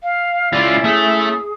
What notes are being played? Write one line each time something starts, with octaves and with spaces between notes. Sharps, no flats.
F5
C#2 C#4 E4 F4 D5
A3 G#4 E5